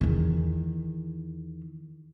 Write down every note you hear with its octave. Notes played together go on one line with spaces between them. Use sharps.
E2 D#3